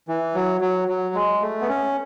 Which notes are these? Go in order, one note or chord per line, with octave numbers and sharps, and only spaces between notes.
E3
F#3
F#3
F#3
G#3
A3
B3
C#4